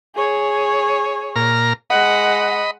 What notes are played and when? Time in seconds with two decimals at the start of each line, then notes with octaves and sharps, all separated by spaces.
0.15 G#4 C#5
1.36 A#2 A#5 F6
1.90 G#3 D#5 F#5 B5